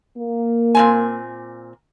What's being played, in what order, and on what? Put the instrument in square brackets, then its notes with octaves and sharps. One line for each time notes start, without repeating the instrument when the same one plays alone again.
[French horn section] A#3
[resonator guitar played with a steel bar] A#2 C4 G#5